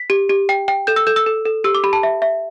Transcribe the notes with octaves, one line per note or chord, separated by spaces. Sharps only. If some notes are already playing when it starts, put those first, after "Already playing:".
Already playing: B6
G4
G4
G5
G5
A4 G6
E6
A4 G6
E6
A4
A4
G4 E6
D6
G4 B5
A5
E5
E5